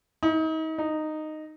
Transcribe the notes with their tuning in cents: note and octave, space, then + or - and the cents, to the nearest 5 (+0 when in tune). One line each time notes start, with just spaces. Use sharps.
D#4 +35
D#4 -10